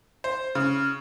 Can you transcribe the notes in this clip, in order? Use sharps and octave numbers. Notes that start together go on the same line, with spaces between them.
C5
C#3